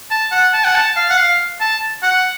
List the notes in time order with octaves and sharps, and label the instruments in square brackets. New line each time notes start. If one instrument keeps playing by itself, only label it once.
[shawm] A5
F#5
A5
F#5
A5
F5
F#5
F5
A5
F#5